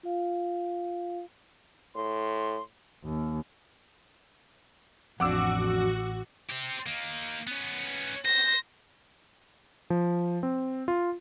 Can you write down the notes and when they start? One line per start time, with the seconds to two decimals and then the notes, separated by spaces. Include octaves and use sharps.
0.03 F4 F5
1.95 A2 C6
3.04 D#2
5.20 A1 F2 D4 F#4 F#5 D6 E6
6.50 C4 G4
6.86 D#3 A#3
7.47 B3 C#4
8.25 C5 A#6
9.90 F3
10.43 C4
10.88 F4